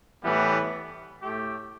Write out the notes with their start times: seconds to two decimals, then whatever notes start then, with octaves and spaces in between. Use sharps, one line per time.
0.22 A2 E3 G3 B3
1.21 A2 A3 G4